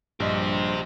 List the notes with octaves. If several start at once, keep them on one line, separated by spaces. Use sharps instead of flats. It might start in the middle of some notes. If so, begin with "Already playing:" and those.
A#1 G2 G4 C5 D#5